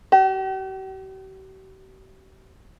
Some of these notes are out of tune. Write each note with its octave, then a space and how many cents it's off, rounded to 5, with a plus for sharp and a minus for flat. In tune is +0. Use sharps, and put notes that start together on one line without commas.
G4 -45